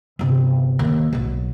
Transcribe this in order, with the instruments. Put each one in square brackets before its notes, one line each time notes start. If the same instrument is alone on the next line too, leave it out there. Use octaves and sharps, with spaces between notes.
[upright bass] G1 C3
D#2
B1 F#3